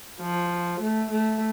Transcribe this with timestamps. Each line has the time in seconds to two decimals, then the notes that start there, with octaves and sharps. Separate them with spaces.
0.21 F3
0.80 A3
1.11 A3